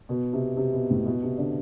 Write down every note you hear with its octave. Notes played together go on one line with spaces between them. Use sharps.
B2
C3
C3
B2
A2
B2
C3
D3